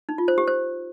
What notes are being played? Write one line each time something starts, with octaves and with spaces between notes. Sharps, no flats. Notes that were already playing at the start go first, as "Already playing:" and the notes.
D#4
F4
C5
G4
C5